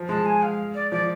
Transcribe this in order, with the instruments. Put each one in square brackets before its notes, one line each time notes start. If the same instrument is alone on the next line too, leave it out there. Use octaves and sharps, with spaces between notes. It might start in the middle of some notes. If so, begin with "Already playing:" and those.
Already playing: [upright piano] F3
[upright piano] G#3 [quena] A5
[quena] G#5
F5
D5
[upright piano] F3 [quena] D5